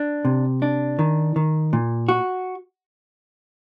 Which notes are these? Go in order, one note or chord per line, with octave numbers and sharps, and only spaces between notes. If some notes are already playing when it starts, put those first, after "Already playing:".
Already playing: D4
C3
D4
D#3
D#3
A#2
F#4